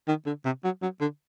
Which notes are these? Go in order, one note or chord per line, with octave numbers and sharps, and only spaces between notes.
D#3
D3
C3
F#3
F#3
D3